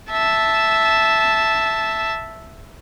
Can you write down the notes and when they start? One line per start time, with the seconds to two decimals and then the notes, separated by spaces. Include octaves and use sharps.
0.11 E5 A5